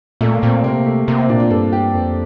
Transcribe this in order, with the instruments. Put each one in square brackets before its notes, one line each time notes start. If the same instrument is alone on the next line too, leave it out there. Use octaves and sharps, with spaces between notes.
[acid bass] A#2 [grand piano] A3
[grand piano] A#3
[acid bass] A#2 [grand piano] C4
[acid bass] C3 [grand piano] A#3
[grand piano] A3
[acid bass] C3 [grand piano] A#3
[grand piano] C4
[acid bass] A#2 [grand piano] D4
[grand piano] F4
[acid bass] G2 [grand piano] A4
[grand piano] G4
[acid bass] F2